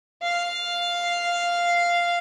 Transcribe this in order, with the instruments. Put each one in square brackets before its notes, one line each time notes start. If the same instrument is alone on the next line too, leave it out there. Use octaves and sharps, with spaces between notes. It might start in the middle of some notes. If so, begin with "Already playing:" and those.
[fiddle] F5